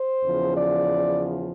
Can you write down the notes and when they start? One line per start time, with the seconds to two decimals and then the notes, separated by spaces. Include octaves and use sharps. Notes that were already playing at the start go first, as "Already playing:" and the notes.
Already playing: C5
0.23 E2 C#3 F3
0.57 D5